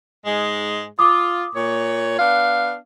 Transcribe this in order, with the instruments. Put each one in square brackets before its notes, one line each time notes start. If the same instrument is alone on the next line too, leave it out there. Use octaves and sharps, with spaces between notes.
[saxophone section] G#2 G#3
[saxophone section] F4 [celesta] D6 D#6
[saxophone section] A#2 C#5
B3 D4 F5